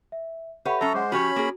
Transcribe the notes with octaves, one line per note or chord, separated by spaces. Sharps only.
E5
G4 A4 B4 C#5 E5 F#5
F#3 C#4 A4 E5 A#5
G#3 C5 F#5 D6
F3 C#4 F#4 G4 C#5 B5
A#3 G#4